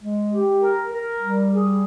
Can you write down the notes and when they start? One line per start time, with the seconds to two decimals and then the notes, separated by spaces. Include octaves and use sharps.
0.03 G#3
0.32 G4
0.62 A#4
0.91 A#4
1.20 G3
1.50 G#4